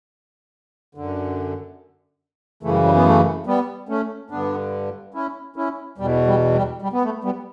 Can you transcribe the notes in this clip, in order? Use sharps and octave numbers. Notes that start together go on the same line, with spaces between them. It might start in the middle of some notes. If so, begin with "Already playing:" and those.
F#2 D3
F#2 C#3 E3 A3
G3
G3
B3
A3
G3 B3
A3 C#4
G2 D3 B3 D4
C#4 E4
C#4 E4
E2 B2 G3
G3
G3
G3
B3
A3
G3 B3